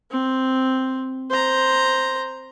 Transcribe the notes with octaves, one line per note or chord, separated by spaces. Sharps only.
C4
C5 A#5